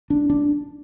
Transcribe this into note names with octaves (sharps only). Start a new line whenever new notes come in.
D4
D4